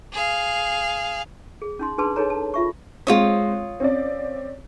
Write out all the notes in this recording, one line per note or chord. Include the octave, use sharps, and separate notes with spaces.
G#4 F5
G#4
C#4 D#4 C6
D4 G#4 B4 A5 C6
D#4 G#4 A4 C#5 A#5
A5
F4 E5 C#6
G#3 C4 F4 C#5 D#6
C4 C#4 D5